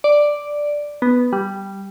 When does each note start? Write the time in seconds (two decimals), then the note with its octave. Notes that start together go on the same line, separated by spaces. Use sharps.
0.04 D5
1.02 B3
1.33 G3